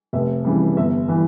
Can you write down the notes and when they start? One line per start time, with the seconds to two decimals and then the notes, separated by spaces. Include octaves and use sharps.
0.13 F1 E5
0.44 F2 C#3 E3 G3
0.77 G1 E5
1.08 E3 G3